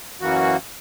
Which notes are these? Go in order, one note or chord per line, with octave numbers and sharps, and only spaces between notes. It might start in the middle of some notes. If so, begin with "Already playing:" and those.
F#2 E3 A#3 F#4